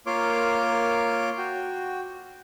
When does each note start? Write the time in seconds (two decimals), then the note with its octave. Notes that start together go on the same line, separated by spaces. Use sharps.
0.06 A#3 F4 A#4 C#5 C6 D6
1.38 F#4 G5